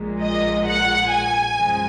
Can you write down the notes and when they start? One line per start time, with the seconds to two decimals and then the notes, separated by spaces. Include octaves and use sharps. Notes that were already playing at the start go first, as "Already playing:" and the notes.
Already playing: A#1 A#2 G#3
0.21 D#5
0.66 F#5
1.11 G#5
1.55 F#2 C#3 F3 G#3